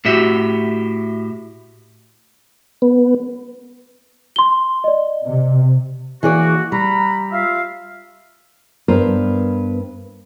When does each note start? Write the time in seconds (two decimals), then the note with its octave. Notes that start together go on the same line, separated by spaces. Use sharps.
0.05 A2 F#4 G4 E5
2.82 B3
4.36 C6 G7
4.84 D5 D#5
5.25 C3
6.23 E3 A#3 F#4 G#4 D5
6.72 G3 A#5 B5
7.32 F4 E5 F5
8.88 G2 B3 A#4 C5